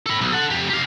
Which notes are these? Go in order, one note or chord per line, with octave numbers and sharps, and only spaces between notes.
A4 B5
B1
A4 F#5
F2 G4
G4 F5